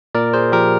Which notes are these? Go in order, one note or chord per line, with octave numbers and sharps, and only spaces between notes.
A#2 A#4 D5
G#4 C5
F3 G4 A#4